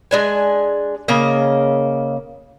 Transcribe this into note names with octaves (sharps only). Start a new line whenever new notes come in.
G#3 D4 G#5
C#3 A#3 D#5